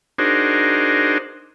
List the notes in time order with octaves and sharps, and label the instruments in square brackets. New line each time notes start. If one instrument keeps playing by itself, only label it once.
[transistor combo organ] D4 D#4 F#4 G#4 A#4 C5